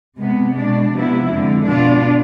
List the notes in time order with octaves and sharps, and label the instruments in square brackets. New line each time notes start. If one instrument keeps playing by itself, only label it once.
[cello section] C3 G#3 B3
B2 G#3 D4
C3 F3 B3 E4
F2 D3 G#3
B2 B3 D4 F4